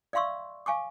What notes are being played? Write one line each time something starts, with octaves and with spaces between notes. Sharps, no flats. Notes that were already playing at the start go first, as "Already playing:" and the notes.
D5 E5 F5 C6 C#6 E6
F5 G#5 C#6 D6